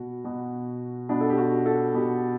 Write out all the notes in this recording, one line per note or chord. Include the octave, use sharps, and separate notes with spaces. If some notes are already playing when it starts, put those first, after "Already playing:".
Already playing: B2 F#4
B2
B2 D4
A4
G4
F#4
A4
B2 G4